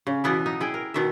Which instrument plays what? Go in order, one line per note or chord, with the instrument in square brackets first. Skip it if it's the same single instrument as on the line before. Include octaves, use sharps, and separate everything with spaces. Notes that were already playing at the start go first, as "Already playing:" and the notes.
[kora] C#3
B2 E3 B3 E4
D#4
E4 G#4 G5
A#4
B2 D#3 E5